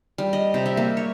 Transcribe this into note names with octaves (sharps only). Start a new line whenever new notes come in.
G3
D#5
C3
E5
A#3
C#5